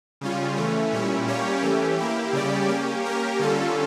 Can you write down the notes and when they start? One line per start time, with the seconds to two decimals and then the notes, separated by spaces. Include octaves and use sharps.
0.21 C#3 G3 C#4 F4
0.56 E3 A3 C#4
0.93 A#2 G3 C#4 E4
1.28 G3 A#3 C#4 G4 C#5
1.63 E3 A3 C#4 G4
1.99 A#3 E4 G4
2.33 C#3 G3 C#4 G4 D5
2.68 A#3 C#4 G4
3.03 A#3 C#4 G4 A#4
3.39 D3 G3 C#4 F4 A4